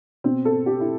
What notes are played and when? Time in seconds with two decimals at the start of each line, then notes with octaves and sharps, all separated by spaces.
0.24 B2 C4
0.45 A4
0.66 G4
0.80 E4